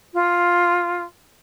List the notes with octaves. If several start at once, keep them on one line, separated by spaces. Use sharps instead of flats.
F4